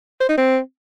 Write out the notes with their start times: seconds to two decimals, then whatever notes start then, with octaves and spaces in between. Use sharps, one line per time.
0.21 C5
0.29 D#4
0.38 C4